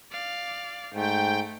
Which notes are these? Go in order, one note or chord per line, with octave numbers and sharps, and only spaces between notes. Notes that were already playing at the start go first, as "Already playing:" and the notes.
D5 F5
G#2 A3 G5